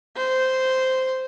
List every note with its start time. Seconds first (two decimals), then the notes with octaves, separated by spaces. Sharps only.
0.17 C5